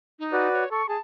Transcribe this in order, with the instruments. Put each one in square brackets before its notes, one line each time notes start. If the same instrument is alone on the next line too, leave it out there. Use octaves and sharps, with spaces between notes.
[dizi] D#4
[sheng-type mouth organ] F#4 B4 D5
[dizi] C#5
[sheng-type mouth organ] A4 [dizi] C#6
[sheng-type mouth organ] G#4 [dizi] A5